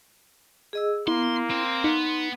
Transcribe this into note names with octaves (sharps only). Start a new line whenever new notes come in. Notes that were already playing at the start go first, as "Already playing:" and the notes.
G#4 D#5 E6
A#3 B3 E4 C6
C4 C6
B3 D#4